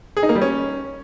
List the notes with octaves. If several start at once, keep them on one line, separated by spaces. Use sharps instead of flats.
G#4
D#4
A#3
G3
C#4